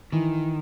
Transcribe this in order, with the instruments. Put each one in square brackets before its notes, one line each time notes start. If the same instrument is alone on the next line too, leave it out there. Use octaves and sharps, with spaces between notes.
[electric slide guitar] D#3 [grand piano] E3